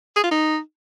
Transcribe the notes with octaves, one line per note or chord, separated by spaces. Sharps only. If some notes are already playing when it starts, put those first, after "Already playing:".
G#4
F4
D#4